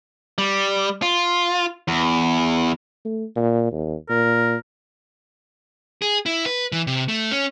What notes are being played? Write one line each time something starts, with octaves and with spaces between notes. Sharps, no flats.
G3
F4
E2
A3
A#2
D#2
A#2 A#4
G#4
E4
B4
E3
C3
A3
C#4